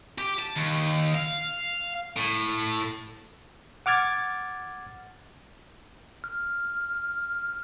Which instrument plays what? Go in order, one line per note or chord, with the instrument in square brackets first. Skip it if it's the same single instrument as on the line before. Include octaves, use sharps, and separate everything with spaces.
[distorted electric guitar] G4
A5
D#2
F5
A2
[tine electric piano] F#5 D6 F6 G#6 A6
[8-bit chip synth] F6